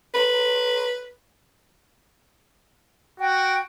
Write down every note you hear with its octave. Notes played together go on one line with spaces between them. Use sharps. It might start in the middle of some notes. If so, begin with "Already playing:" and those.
B4
F#4 G5